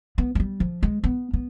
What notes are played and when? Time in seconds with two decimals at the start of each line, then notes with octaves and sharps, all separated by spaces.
0.18 B3
0.35 G#3
0.40 G3
0.60 F3
0.83 G#3
1.04 B3
1.33 B3